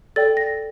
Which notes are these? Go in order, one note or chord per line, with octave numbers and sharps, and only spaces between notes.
A4 D5 G5 A6
A#6